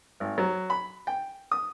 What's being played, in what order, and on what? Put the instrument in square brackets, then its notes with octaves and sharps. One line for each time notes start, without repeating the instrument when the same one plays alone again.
[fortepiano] G#1
F#3
B5
G5
D#6